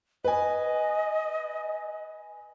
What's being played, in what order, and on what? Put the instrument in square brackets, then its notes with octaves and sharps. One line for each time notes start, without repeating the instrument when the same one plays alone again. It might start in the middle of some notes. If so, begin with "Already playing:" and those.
[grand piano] B4 G#5 [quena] D#5